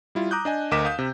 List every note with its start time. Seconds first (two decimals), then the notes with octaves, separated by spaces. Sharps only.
0.15 G3 E4 F4
0.31 A#5 D6 D#6 F#6 G6
0.45 D4 D#5 G#5
0.71 D2 A#4 D#5 D6 B6 E7
0.85 F5 D#6 G6
0.99 C3